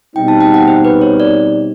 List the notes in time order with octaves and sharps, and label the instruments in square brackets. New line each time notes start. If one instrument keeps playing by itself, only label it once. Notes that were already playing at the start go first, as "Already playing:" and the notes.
[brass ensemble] B2 G3 C4 D#4 [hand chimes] G5
[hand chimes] A5
G5
F#5
C5
B4
C#5
D5